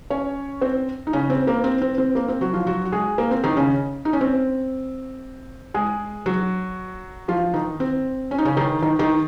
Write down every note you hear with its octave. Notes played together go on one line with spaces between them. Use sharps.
C#4 C#5
C4 C5
D#4
C#3 C#4
C4
A#3
C4
C4
C4
A#3
C4
F#3 F#4
F3 F4
F#3 F#4
F#4
G#3 G#4
A#3
C4
D#3 D#4
C#3 C#4
D#4
C#4
C4
G#3 G#4
F#3 F#4
F3 F4
D#3 D#4
C4
C#4
D#4
C#3 C#4
D#3 D#4
D#3 D#4
D#3 D#4